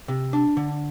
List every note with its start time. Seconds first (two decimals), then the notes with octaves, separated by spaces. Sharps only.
0.08 C3
0.33 D4
0.57 D3